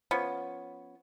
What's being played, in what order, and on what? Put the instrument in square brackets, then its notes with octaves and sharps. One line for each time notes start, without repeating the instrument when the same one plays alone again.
[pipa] F3 B3 C#4